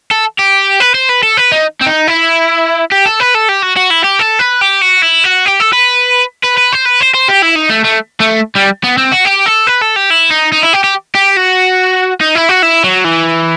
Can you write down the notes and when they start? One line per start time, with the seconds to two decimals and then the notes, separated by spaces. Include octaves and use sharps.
0.11 A4
0.39 G4
0.80 B4
0.95 C5
1.09 B4
1.23 A4
1.37 B4
1.52 D#4
1.81 C4
1.86 D#4
2.07 E4
2.92 G4
3.06 A4
3.20 B4
3.34 A4
3.48 G4
3.62 F#4
3.76 F#4
3.90 E4
4.04 G4
4.19 A4
4.39 B4
4.61 G4
4.82 F#4
5.02 E4
5.24 F#4
5.46 G4
5.60 A4
5.73 B4
6.43 B4
6.57 B4
6.72 C5
6.85 B4
7.01 C5
7.14 C5
7.29 G4
7.42 E4
7.56 D#4
7.70 A3
7.85 A3
8.20 A3
8.55 G3
8.84 B3
8.98 C4
9.12 F#4
9.25 G4
9.46 A4
9.67 B4
9.82 A4
9.96 G4
10.10 E4
10.30 D#4
10.52 D#4
10.63 E4
10.73 G4
10.84 G4
11.15 G4
11.37 F#4
12.21 D#4
12.35 E4
12.49 F#4
12.63 E4
12.84 F#3
13.05 E3